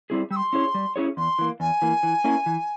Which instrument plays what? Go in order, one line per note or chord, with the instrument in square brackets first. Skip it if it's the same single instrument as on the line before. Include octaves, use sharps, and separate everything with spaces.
[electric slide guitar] G3 C4 E4 G#4
[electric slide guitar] G3 [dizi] E6
[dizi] C6
[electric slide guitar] C#4 E4 G#4 C#5
G3
C#4 E4 G#4 C#5
[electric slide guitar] E2 [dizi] C6
[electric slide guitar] E3 A#3
[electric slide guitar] E2 [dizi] G#5
[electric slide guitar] E3 A#3
E3
A#3 C#4 E4 A#4
E3